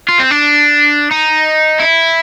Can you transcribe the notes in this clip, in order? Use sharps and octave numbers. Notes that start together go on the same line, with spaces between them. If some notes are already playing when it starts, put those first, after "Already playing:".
F4
C4
D4
D#4
E4